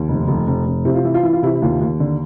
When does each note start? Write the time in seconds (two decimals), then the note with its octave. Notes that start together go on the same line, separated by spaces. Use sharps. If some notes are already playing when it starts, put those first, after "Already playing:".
Already playing: D#2
0.09 F1
0.27 F1
0.47 F1
0.66 F1
0.85 C3 E4
0.95 F4
1.04 E3 E4
1.14 F4
1.23 E3 E4
1.33 F4
1.42 C3 E4
1.55 E4
1.62 D#2 F4
1.81 D#2
2.00 D3